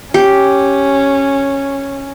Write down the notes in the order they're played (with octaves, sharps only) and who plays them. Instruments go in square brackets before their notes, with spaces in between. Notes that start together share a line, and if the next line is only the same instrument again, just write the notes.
[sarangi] C#4 [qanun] G4